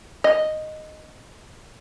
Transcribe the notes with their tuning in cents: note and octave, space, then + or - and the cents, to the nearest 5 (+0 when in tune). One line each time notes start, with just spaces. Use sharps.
D#5 -5